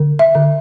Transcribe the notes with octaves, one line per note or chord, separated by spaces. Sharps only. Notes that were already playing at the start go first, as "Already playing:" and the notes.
Already playing: D3
E5
D3